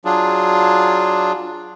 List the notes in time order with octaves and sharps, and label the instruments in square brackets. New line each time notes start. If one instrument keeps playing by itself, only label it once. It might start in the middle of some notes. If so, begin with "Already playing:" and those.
[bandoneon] F#3 D4 F4 G#4